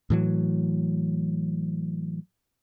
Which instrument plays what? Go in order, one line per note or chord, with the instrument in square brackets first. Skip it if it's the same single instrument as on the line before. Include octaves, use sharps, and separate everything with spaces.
[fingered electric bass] A2 E3 F#3